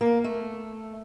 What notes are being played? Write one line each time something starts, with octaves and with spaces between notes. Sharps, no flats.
A#3
A3